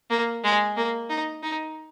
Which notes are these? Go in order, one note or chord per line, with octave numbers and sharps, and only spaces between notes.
A#3
G#3
A#3
D#4
D#4